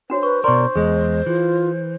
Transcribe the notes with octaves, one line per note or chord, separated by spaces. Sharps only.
D4 F#4 C5 C#5
B4 C#6
B2 A#4 D5 C6 C#6
E2 G#3 G#4 D#5
E3 F4